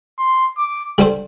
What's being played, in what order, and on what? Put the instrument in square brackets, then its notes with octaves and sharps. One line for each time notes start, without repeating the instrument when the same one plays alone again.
[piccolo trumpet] C6
D6
[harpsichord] D3 G3 D4 A4 C5